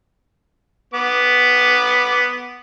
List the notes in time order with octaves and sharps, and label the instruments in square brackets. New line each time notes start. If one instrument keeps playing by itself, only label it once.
[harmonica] B3 D6